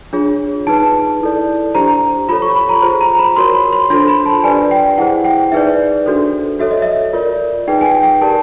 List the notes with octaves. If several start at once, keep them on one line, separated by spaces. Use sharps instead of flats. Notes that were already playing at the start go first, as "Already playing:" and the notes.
D4 F4 G#4 C#5
D#4 G#4 B4 A5
E4 A4 D5
D4 G4 C5 A#5
F4 A4 C#5 B5
C#6
B5
A#5
F4 G#4 C5
A#5
B5
F#4 A#4 C#5 C6
B5
C6
D4 F4 A4 C5 C6
B5
A5
D4 G4 B4 D5 G#5
G5
E4 G#4 C5 F#5
G5
D#4 G#4 B4 D5 E5
D4 F#4 A4 C5
F#4 A4 C#5 E5
D#5
E5
F4 A#4 D5
D#4 G#4 B4 G5
G#5
G5
G5
G4 A#4 D5 A5